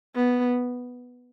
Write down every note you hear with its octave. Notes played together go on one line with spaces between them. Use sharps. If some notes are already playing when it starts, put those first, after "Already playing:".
B3